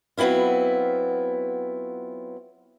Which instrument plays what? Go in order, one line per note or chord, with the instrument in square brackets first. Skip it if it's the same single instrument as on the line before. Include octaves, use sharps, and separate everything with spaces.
[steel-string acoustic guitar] F#3 B3 C4 E4 F4